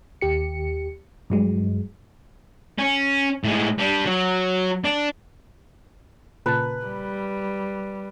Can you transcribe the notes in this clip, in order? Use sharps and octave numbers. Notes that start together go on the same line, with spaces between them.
D#2 G4 C#7
G2 F#3 G#3
C#4
A2 G#3
G3 D4
F#3
D4
A#2 C#3 B4 A5
G3